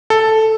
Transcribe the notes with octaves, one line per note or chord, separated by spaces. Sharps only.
A4